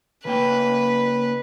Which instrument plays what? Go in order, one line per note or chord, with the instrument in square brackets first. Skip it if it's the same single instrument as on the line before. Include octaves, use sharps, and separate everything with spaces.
[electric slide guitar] C#3 A#3 G5 [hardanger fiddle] B4